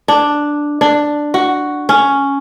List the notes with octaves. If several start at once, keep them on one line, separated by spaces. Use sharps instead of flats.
D4
D4
F#4
C#4